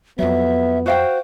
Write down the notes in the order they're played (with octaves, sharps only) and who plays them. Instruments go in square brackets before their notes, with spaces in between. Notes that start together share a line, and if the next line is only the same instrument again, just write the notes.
[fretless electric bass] F2 F#3 [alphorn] B3 [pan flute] E5
[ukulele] F#4 F5 G5 [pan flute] C5